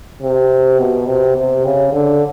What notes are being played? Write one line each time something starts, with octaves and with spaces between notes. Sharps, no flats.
C3
B2
C3
C3
C#3
D3